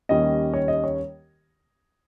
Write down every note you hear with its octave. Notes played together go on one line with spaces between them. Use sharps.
D#2 D#3 G3 C#4 D#5
C#5
D#5
C#5